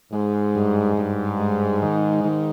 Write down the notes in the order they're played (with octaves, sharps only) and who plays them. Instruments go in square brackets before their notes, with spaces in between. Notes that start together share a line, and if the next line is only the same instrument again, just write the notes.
[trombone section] G#2 [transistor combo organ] G#3
[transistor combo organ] G2
G2
G#3
D#3
D#3